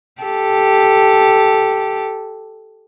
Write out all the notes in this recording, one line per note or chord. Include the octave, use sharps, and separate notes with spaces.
G4 A4